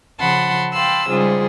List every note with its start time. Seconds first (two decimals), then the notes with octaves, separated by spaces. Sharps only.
0.19 C#3 F3 F#5 A5 B5 C6
0.72 F5 G5 A5 B5 C6 E6
1.09 G#2 C#3 G3 F4 G#4